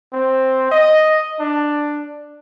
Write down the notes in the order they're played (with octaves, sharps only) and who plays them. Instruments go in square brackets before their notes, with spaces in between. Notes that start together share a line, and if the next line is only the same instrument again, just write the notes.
[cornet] C4
D#5
D4